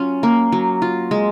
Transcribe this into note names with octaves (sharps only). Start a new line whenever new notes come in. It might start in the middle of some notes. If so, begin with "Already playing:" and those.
Already playing: F#3 C#4 F4
A#3
F#3
F4
G#3